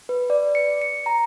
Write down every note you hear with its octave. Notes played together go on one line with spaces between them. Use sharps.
B4
D5
C#7
C#7
A#5